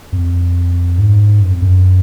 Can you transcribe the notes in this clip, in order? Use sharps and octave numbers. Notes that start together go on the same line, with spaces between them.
F2
G#2
F#2
F2
F#2